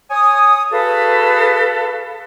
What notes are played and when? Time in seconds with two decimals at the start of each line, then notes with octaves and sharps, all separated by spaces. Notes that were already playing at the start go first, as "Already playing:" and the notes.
0.11 C#5 G#5 D#6
0.71 F#4 G#4 A4 B4 F5